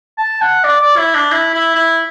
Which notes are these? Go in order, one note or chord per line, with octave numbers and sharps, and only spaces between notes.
A5
F#5
D5
D5
E4
D4
E4
E4
E4